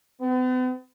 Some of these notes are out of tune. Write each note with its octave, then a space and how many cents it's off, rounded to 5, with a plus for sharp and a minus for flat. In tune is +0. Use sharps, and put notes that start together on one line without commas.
B3 +45